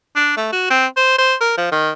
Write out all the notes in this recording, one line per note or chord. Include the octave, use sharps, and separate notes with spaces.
D4
A3
F#4
C4
C5
C5
A#4
F3
D#3